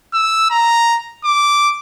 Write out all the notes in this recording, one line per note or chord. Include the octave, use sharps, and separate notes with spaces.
E6
A#5
D6